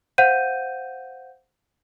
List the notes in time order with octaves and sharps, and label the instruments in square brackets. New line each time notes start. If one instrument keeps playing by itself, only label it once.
[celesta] C5 F5 F#5 G6 D#7